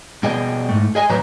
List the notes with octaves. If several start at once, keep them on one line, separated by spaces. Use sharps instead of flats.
B2 G3 G#4 D#5 G5
G#2 A3
G#4 D#5 G#5
A2 C#3 F#3 B4 C5 A#5